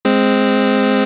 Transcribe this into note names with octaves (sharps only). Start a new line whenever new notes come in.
G#3 C4